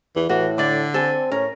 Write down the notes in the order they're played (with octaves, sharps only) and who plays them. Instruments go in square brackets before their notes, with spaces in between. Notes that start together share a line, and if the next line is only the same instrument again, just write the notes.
[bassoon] E2 [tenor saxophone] E3
[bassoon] A2 [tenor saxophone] E3 [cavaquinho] F#4
[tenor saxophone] D3 [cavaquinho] D5 D6
[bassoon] C4 [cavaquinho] A4 G#5
[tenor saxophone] A2 [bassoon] C#4 [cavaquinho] A#4